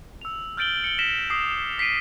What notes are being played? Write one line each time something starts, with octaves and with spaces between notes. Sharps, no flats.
E6 F7
F6 G6 A6 D7 F#7 G7
C#7 F#7 G7
F6 A#6 B6 E7
D6 D#6 C7 E7
D6 B6 C7 D7 D#7